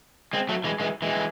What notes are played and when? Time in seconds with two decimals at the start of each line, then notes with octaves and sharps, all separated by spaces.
0.33 G#3 C4
0.49 F#3 A3
0.64 E3 G#3
0.80 E3 G#3
1.02 E3 G#3